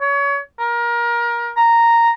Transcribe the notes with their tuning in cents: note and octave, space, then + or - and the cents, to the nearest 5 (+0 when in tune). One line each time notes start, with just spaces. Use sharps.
C#5 +30
A#4 +25
A#5 -5